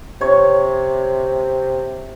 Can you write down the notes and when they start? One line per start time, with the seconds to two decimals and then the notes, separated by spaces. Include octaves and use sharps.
0.21 C3 C#5